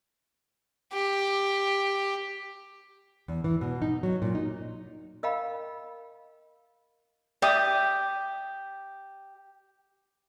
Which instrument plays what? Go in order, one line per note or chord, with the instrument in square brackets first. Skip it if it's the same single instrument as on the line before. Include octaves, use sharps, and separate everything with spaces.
[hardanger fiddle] G4
[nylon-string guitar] E2
E3
B2
D#4
F#3
A#2
D#4
[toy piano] A#4 D#5 F5 G5 B5
[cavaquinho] G4 [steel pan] D5 E5 D#6